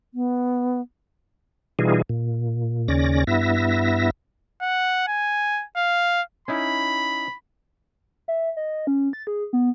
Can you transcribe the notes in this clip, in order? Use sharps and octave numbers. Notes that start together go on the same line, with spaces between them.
B3
B2 E3 G3 D#4 F4 G#4
A#2
D#2 C#3 C#4 D5 A#6
G2 B3 E4 E5 A#6
F#5
G#5
F5
C#4 D#4 E4 B5
E5
D#5
C#4
A6
G#4
B3